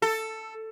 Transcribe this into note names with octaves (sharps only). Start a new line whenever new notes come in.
A4